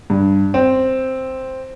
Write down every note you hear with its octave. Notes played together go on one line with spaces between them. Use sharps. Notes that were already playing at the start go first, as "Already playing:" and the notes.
G2
C4